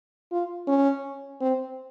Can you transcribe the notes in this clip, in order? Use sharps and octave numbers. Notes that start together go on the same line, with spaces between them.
F4
C#4
C4